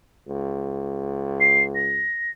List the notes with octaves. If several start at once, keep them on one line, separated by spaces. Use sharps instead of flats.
C#2
C7
A#6